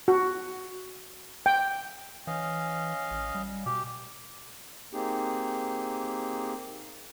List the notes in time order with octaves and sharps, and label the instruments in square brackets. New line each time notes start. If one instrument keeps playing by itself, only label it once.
[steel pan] F#4
G5
[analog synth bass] E3 [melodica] C#4 D#5 F5
[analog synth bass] A1
G3
[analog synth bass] B2 [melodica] G4
[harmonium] A#3 C4 D#4 G4 G#4